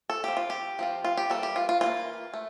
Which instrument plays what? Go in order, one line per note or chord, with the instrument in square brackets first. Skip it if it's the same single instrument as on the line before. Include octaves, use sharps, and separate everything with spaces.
[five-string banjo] A4
F3 C4 F4 G4
F4
G4
F3 C4 F4
F4
G4
E3 G3 A#3 A4
G4
F4
F4
E3 G3 A#3 F4
A3